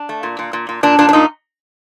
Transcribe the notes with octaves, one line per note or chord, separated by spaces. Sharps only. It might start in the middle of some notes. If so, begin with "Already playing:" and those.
Already playing: D4
A3
A#2
A#2
A#2
A#2
A#2 D4
A#2 D4
D4
A#2 D#4